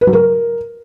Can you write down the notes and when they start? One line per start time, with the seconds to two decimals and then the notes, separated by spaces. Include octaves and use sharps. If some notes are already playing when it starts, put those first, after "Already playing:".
0.01 B4
0.07 F#3
0.13 A#4